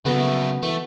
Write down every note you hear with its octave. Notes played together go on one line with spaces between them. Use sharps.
F#2 C#3 A3 B3 F#4
E3 A3